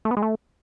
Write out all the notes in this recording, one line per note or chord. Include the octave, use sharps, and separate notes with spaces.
A3
B3
G#3
A3